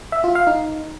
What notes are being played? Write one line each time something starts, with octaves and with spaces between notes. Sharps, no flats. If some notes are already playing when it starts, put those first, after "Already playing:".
E5
F4
F5
D#4